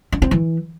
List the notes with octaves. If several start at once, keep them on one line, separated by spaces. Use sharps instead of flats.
C#4
C4
E3